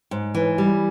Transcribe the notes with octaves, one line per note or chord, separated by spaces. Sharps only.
G#2
E3
G3